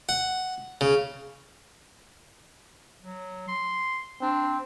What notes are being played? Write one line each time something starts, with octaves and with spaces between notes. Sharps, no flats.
F#5
C#3
F#3
C6
C4 D4